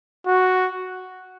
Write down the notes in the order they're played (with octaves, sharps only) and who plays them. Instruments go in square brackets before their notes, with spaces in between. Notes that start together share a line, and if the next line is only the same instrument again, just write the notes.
[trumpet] F#4